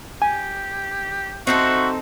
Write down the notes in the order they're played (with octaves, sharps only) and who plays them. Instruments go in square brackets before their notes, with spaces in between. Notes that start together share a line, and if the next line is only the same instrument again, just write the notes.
[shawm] G4 [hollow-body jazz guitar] G#5
[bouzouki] C4 D#4 A4 [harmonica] F#4 [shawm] E5